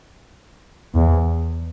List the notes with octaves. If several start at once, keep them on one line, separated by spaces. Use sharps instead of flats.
E2